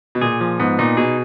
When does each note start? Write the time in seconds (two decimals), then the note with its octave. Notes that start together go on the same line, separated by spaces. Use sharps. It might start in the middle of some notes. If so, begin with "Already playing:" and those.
0.15 B2
0.21 A#2 G#4
0.41 F3
0.60 G#2 B3
0.79 A#2 D#4
0.97 B2 G#4